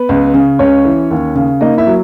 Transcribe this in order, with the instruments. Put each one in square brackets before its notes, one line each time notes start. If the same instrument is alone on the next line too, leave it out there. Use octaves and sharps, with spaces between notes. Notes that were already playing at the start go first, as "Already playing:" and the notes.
Already playing: [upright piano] B3 B4
C#2
C#3
C#2 C#4 C#5
E3
D#2
C#3
A#3 D#4 D#5
E4 E5
F#3